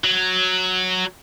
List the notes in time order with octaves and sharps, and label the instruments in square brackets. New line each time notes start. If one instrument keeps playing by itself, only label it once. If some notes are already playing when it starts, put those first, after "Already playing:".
[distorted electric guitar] F#3